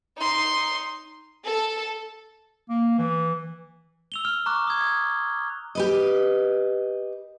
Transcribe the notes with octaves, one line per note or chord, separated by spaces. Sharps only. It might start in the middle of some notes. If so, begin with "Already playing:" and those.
D#4 C6
A4
A#3
E3
E6 F7 G7
F6 F7
A#5 C#6 D6 F#6
D#6 G#6
G4 B4 D#5